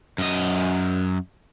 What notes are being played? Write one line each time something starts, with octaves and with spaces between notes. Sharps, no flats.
F#2 D#5